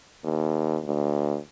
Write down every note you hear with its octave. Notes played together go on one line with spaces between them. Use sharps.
D#2
D2